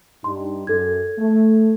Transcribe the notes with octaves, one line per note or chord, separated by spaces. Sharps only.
G2 G3 D#4 C6
F#2 A4 G#6
A3